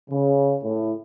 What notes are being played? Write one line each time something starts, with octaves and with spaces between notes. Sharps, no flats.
C#3
A2